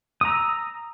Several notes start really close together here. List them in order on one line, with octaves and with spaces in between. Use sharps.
D#6 A#5 E6